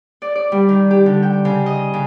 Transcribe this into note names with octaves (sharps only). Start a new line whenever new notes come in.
D5
D5
G3
D#3
G4
D3
G5
C#3
D#5
C#3